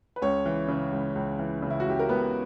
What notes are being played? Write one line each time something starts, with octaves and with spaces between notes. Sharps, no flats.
B4
C#2 C#4 C#5
E3
C#3
C#2
C#2
E3
C#3
E4
F#4
C#2 G4
A#4
C#2 B3 B4